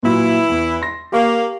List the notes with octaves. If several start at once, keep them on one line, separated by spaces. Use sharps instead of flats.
A#2 E3 F#3 E4
E2
C6 A#6
A#3 G4 F5 C#6